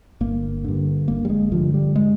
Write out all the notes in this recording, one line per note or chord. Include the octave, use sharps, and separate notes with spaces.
G1 A#3
G2 D3
G1 A#3
G3
G#3
G2 D3 F3
G3
G#3